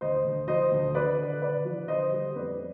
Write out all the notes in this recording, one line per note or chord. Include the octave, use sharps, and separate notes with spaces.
D2 C5 D#5
D2
F3 C5 D#5
D2
D3 B4 D5
D3
D3 B4 D5
F3
D3 C5 D#5
G3
F2 B4 D5